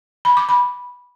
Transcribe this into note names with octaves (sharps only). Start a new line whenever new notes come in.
B5
D6
B5